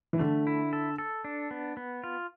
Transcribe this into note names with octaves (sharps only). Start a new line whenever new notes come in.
E3
D3 A3
E4
A4
A4
D4
B3
B3
F4